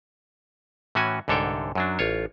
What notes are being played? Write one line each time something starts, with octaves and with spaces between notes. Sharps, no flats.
A2 E3 C#4 F#4 G#5
C2 G#2 D3 A4 C#5 G5
F#2 F#3 D4
A1 F4 C#5